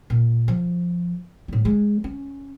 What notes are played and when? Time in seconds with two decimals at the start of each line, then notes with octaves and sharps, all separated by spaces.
0.10 A#2
0.48 F3
1.48 A2 G3
1.65 G#3
2.04 C#4